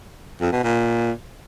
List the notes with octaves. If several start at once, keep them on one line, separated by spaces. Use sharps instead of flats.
F2
B2
A#2